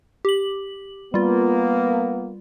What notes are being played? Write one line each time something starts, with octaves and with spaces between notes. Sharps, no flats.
G4 F#7
G3 A#3 B3 F4